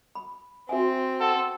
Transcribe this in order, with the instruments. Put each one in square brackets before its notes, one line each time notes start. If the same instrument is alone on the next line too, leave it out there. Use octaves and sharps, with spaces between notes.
[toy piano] B5
[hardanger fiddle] C4 [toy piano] F#4 E5 G#5
[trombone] A4 [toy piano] F#5 G5 C6